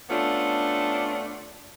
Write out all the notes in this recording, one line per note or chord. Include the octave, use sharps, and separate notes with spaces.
A3 B3 C#4 D4 F4